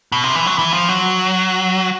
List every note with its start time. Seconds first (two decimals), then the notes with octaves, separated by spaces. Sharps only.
0.12 B2
0.24 C3
0.35 E3
0.46 F#3
0.59 E3
0.72 F3
0.89 F#3